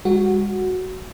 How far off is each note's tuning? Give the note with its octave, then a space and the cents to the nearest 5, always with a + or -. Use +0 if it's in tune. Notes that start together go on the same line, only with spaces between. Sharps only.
G#3 -45 F#4 +0